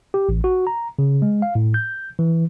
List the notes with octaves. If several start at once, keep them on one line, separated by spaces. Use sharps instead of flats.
G4
A1
F#4
A#5
C#3
G#3
F5
A2
G6
E3